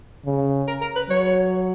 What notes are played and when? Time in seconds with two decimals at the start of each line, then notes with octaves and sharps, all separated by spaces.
0.26 C#3
0.68 A#4
0.81 A#4
0.96 B4
1.09 F#3 C#5